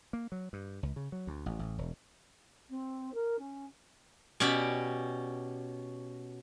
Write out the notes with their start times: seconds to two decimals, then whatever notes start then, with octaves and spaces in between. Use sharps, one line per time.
0.13 A#3
0.32 F#3
0.53 G2
0.83 C#2
0.96 C#3
1.12 F#3
1.27 D2
1.46 A1
1.59 A1
1.78 E1
2.70 C4
3.14 A#4
3.38 C#4
4.40 B2 C#4 G4 D5 B5